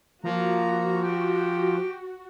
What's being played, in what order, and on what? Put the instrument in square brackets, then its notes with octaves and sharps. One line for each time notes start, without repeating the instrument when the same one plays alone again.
[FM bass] F3 [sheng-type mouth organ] A#3 A#5 [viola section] F#4
[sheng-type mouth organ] G4 G5